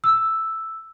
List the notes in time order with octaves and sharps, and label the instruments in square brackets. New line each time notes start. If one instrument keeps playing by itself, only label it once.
[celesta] E6